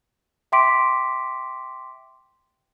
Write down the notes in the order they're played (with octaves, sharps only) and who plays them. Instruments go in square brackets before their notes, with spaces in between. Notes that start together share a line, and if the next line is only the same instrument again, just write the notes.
[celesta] E5 G5 C6 D6 B6 D7